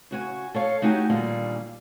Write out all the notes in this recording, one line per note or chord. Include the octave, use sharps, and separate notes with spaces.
C#3 F#4 G#5
A4 C#5 F5
A3 D#4 F#4 G4 G#5
D#2 A#2 D3 G3 G#4 F5